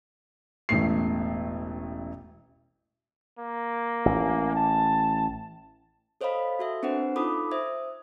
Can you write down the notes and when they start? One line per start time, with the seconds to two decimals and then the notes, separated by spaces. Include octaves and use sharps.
0.69 E1 A1 A3 C7
3.40 A#3
4.06 A1
4.56 A5
6.21 A4 C5 C#5 D#5 F5 B5
6.59 F#4 A4 E5
6.83 C4 D4 B4 C5 F#5
7.16 D#4 F4 A4 B5 D6 D#6
7.51 C5 E5 D#6 G#6